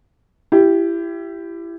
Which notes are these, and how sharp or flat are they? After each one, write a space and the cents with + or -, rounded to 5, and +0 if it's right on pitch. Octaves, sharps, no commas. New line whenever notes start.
E4 +25 G4 +0